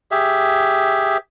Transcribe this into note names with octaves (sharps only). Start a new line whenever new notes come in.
G4 G#4 E5